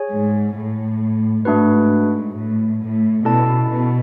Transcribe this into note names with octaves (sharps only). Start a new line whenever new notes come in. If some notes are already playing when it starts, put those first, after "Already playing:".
Already playing: G#4 C#5 G#5
G#2
A2
G#2 A3 D4 F#4 B4
A2
A2
B2 C#4 E4 A4 D5 A5
B2